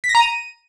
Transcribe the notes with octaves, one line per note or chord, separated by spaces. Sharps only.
B6
A#6
A#5
D#7